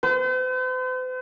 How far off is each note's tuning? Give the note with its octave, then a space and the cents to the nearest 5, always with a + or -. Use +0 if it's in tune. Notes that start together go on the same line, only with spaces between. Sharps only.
C5 -45